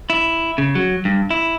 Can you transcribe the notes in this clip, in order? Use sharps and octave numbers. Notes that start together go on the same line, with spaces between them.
E4
C#3
F#3
G2
E4